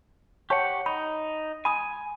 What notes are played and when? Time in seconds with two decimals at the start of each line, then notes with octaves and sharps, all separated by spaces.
0.50 G4 C#5 F#5 A5 C#6
0.86 D#4 B5
1.65 G#5 B5 D#6